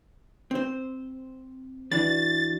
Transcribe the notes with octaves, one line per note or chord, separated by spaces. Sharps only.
C4 C5
E3 D4 F#4 A6